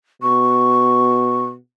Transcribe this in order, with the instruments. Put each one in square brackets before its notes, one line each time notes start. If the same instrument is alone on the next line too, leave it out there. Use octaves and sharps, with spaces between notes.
[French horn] B2 [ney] C#6